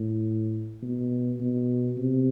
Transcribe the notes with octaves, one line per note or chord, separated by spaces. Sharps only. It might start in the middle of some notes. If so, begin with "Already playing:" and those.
Already playing: A2
B2
B2
C3